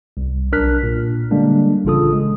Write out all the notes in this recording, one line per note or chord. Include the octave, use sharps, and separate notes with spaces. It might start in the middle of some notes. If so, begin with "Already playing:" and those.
C2
B1 D4 A#4 F6 F#6 B6
A#2
D3 G3 G#3 A#3 D4
A1 C#3 F4 A4 D#6
G#3